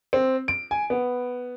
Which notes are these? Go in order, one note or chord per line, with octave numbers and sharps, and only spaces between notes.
C4
D7
G#5
B3